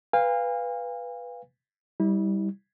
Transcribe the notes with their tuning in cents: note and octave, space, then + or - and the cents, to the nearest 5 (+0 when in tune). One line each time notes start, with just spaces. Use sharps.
B4 +0 F5 +0 G#5 -40
G3 +0 E4 -35